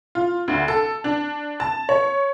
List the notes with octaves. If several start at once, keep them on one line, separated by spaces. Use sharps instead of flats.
F4
D2
A4
D4
A5
C#5